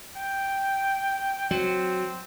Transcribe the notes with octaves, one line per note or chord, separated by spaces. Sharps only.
G5
F#3 C4